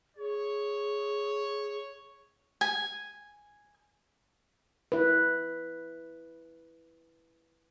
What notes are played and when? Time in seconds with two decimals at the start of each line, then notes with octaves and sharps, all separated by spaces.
0.17 G#4 C#5
2.61 G#5
4.92 E4 B4